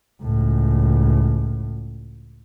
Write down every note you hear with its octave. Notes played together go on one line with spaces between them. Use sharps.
C#2 A2